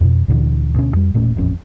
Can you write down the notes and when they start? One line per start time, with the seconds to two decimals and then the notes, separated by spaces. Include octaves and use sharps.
0.01 F2 B2
0.28 D2 A#2 D3 E3
0.74 D2 B2 C#4
0.93 F2 G3
1.14 E1 A#2 A3 C#4
1.36 D#1 A1 F2 C#4